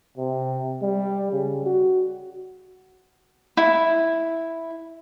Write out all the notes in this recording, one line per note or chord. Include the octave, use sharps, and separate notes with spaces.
C3
G3
C#3
F#4
E4